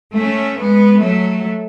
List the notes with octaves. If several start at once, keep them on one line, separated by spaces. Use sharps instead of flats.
A3 C#4
G#3 B3
F#3 A3